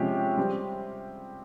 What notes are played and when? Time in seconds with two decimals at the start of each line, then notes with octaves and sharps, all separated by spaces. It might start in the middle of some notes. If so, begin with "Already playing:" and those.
Already playing: C3 F3 G#3 C#4 G4
0.37 G3 C4 G4